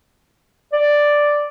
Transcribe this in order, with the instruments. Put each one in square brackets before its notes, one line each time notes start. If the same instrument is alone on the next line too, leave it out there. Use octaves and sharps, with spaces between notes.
[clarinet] D5